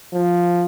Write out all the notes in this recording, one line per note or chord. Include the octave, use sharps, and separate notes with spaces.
F3